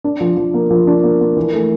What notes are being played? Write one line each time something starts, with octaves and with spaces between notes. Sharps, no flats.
D4
F3
F3
A#3
F3
D4
A#3
A#3
E3
A3